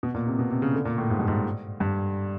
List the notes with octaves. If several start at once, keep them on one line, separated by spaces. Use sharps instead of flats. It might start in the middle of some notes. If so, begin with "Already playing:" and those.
B2
A#2
C3
B2
C3
C#3
D3
A#2
A2
G#2
G2
G#2
G2